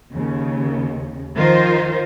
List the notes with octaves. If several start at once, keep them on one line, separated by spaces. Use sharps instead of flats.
D#2 C#3
D#3 F3 F4 A#4 C5